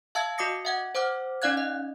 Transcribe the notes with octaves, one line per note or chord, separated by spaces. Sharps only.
E5 F5 A5 E6 G#6
F#4 D#5 D6 D#6 A#6 C#7
E5 F#5 G#6
C5 F#5 D6 F6
C#4 D#4 D5 F5 F#6 G#6
D#5